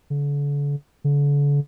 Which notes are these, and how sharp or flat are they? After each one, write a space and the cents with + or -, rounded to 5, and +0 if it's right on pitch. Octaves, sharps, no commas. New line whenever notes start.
D3 -40
D3 -40